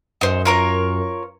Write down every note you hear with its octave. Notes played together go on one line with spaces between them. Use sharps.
F#2 D#4 C5
F4 A#4 C#5